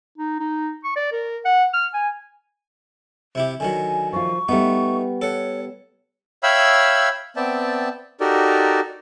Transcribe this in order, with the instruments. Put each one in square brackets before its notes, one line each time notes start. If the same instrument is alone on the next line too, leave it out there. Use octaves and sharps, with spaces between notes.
[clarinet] D#4
D#4
C#6
D5
A#4
F#5
F6
G#5
[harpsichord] C3 E4 G4
[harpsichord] D3 D#3 F#3 [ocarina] G#5
[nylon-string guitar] F3 F4 [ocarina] C#6
[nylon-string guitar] G3 B3 [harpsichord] A3 D#4
[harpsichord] A4 F#5 [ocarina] C#5
[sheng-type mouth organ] C#5 E5 F5 G5 B5 E6
B3 C4 D5 E5 G5 A5
D#4 F#4 G4 A4 A#4 D5